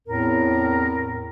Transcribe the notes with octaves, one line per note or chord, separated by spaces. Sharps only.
E2 A2 C4 A#4